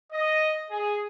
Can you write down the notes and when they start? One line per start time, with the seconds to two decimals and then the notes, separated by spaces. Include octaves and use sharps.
0.12 D#5
0.71 G#4